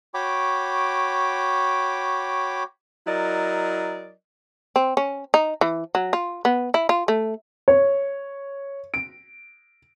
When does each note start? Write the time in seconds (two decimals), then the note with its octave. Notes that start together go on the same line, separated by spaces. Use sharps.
0.14 F#4 C#5 G5 B5 D6
3.07 F#3 E4 A#4 D5 D#5
4.76 C4
4.97 C#4
5.34 D#4
5.61 E3
5.95 F#3
6.13 F4
6.45 B3
6.74 E4
6.89 F4
7.08 A3
7.68 C#5
8.94 D7